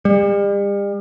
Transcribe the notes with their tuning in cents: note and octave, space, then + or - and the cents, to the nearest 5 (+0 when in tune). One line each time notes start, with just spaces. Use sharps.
G3 +40